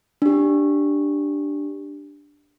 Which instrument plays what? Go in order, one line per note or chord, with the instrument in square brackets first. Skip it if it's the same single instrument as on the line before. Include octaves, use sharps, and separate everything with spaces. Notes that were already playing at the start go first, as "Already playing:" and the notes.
[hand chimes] D4 G4